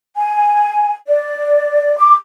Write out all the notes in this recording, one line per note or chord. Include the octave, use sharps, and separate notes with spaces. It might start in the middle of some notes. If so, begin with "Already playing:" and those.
G#5
D5
D6